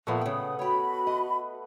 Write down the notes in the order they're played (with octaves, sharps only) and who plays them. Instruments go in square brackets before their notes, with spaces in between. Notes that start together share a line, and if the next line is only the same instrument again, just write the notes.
[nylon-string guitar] A#2 F3 [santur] A3 B3
[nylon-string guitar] C#3 G5 [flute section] D#6
[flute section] F#4 B5 [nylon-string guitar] C#5 G5
[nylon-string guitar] D#5